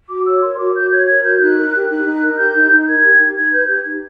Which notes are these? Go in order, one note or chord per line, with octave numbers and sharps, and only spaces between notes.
F#4 D6
C#5 E6
A#4 C6
F#4 D6
F#4 G6
C#5 G#6
A#4 G#6
F#4 G6
D#4 F#6
A#4
G4
D#4 F#6
D#4
A#4
G4 G6
D#4
D#4
G6
A#4 G#6
G4
D#4
D#4 G#6
B4 G6
G4 G#6
D#4